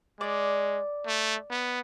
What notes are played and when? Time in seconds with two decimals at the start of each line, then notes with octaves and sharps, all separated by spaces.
0.20 G#3 D5
1.07 A3
1.50 B3